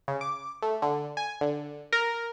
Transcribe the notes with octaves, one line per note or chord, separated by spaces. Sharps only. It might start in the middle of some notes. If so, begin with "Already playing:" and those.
C#3
D6
A3
D3
G#5
D3
A#4